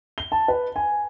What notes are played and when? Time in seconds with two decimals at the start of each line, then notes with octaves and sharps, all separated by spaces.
0.18 G7
0.32 A5
0.48 B4
0.76 G#5